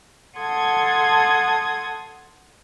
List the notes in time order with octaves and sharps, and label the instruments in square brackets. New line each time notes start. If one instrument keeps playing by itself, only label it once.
[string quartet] A4 F#5 A5 C6 D#6 G#6